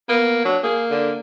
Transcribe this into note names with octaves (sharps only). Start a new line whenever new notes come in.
A#3 B3
F#3 D4
A#3 G#4
D3